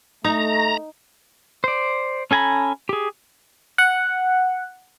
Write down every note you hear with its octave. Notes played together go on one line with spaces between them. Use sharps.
A3 D#4 A#5
C5 D5
C#4 A4 G#5 A#5 B5
G4 G#4
F#5